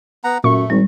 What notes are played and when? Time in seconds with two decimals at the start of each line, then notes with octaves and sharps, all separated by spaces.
0.24 B3 F#5 A#5
0.44 F#2 A#2 A3 C#6
0.70 G#1 G3